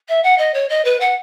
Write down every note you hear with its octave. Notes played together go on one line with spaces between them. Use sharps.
E5
F#5
D#5
C#5
D#5
B4
F#5